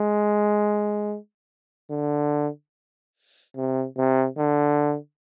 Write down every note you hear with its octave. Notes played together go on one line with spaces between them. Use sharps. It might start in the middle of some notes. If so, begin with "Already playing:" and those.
Already playing: G#3
D3
C3
C3
D3